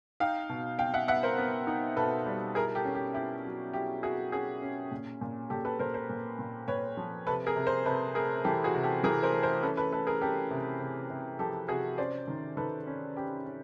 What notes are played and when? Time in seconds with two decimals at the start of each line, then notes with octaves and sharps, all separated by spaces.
0.20 D#4 F5 G5
0.49 B2
0.79 B2 F5 G5
0.94 E5 F#5
1.08 B3 E5 F#5
1.23 A#4 C5
1.38 B3
1.67 D#4
1.97 B2 A4 B4
2.26 G3
2.55 E4 G#4 A#4
2.75 G4 A4
2.85 C#4
2.95 G4
3.14 E4 G4
3.44 F#3
3.73 E4 G4
4.03 E4 F#4 G#4
4.32 C#4 F#4 G#4
4.62 C#4
4.91 A#2
5.21 A#2
5.50 A#2 G4 A4
5.65 A4 B4
5.79 A#2 A#4 C5
5.94 A#4 C5
6.09 A#2
6.39 A#2
6.68 A#2 B4 C#5
6.97 F3
7.27 C3 A4 B4
7.46 G#4 A#4
7.56 C3
7.66 A#4 C5
7.85 C3 A4 B4
8.15 A3 G#4 A#4
8.45 E3 G4 A4
8.64 F#4 G#4
8.74 C3
8.84 G4 A4
9.03 E3 G#4 A#4
9.23 A#4 C5
9.33 A3
9.43 A#4 C5
9.63 C#4 A4 B4
9.77 A4 B4
9.92 A3 A4 B4
10.07 G#4 A#4
10.21 C#4 G4 A4
10.51 C3
10.80 C3
11.10 C3
11.39 F3 G4 A4
11.68 C3 F#4 G#4
11.98 C#4 C5 D5
12.28 D#3
12.57 D#3 A4 B4
12.87 C#4
13.16 C#4 G4
13.45 C#4